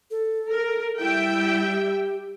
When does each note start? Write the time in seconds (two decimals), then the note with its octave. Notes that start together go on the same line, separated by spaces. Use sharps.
0.11 A4
0.51 A#4
0.99 G3 E4 E5 G5
1.72 G4